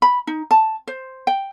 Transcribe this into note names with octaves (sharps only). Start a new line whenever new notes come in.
B5
D#4
A5
C5
G5